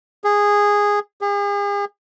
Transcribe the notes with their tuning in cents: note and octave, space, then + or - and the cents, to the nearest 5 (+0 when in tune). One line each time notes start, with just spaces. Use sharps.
G#4 -10
G#4 -40